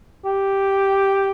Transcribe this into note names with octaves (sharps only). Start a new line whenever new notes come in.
G4